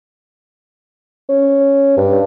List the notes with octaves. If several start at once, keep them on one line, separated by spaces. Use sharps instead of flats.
C#4
G2